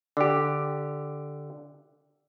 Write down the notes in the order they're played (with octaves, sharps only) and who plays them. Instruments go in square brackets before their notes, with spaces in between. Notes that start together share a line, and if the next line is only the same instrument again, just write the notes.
[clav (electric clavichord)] D3 G4